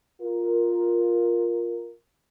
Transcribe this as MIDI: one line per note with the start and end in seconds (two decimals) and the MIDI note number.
0.21 1.92 65
0.21 1.92 70